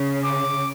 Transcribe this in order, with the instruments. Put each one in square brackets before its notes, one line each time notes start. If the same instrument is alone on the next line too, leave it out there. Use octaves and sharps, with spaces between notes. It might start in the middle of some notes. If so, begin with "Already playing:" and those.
Already playing: [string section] C#3
[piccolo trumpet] D6